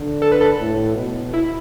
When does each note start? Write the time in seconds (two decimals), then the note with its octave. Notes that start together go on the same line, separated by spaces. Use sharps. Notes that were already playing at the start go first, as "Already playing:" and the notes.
Already playing: D3
0.22 A4
0.32 B4
0.41 A4
0.59 A2
0.96 B2
1.33 E4